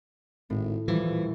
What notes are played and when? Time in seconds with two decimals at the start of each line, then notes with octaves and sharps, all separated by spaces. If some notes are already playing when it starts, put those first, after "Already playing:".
0.50 G#1 A2
0.88 D#1 E3 F3 G3 E4